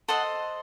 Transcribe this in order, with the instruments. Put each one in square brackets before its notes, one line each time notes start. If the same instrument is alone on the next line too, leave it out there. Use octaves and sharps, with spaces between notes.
[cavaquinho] A4 C5 D#5 F#5